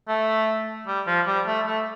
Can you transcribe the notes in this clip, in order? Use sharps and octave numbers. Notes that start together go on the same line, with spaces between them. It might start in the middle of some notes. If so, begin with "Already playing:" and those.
A3
G3
F3
G3
A3
A3